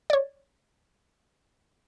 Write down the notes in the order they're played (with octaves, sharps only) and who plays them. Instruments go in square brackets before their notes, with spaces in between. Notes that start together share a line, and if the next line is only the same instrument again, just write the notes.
[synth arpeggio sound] C#5 D5